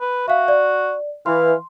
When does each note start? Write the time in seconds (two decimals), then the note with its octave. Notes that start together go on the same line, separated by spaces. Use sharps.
0.01 B4
0.28 F#4 E5 F5
0.48 D5
1.26 E3 F5 C6